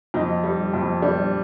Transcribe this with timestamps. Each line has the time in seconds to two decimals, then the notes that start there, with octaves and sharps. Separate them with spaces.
0.14 F2 D#4
0.44 G3
0.74 F2
1.02 G3 D4